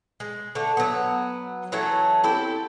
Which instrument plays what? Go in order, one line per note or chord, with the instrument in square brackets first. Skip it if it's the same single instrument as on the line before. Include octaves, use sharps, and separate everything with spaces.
[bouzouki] G#3
D3 A3
F#3 B3
E3 F#3 A3 C#4
C4 E4 G4 A4